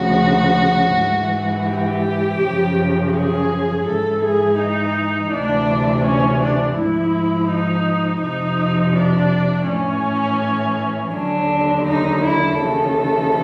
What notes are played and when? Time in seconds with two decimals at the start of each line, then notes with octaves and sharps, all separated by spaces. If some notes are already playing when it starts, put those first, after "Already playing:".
Already playing: D2 C#3 F3 F#4
0.95 G#2 E3
1.68 G4
2.40 F#2 C#3 F3
3.14 G#4
3.86 G#2 E3 A4
4.23 G#4
4.59 D#4
5.31 D2 C3 E3 D4
6.05 C#4
6.41 D4
6.77 G#2 F3 E4
7.50 D#4
8.22 F2 C3 F3 D#4
8.96 D4
9.68 A2 E3 C#4
11.13 D#2 D3 F#3 D4
11.86 D#4
12.23 E4
12.58 D#2 C#3 E3 A4